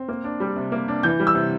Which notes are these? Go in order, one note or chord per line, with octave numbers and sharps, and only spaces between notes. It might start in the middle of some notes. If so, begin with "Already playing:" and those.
Already playing: C4
A#3
D4
G3
C3
A#3
D4
E3 G6
G3
E6
C3